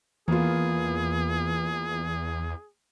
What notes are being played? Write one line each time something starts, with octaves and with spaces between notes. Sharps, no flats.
E2 E3 A#3 B3 F4 G#4